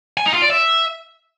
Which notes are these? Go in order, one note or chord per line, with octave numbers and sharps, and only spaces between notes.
G#5
D#4
F4
D5
E5